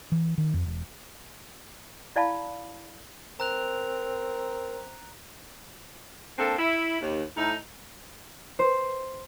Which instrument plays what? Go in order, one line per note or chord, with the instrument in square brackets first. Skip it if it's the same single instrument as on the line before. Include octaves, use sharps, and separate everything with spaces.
[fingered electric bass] E3
D#3
F2
E1
[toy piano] E4 D5 F5 A5 B5
[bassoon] C4 [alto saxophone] A#4 [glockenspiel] A#5 F#6 F7
[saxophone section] A#3 C4 D4 A4
E4
D#2
A2 D#4
[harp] C5